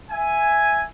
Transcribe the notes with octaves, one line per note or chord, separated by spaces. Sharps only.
E5 G#5